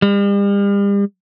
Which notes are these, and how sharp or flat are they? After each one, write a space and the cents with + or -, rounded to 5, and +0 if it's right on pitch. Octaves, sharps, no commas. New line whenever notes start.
G3 +40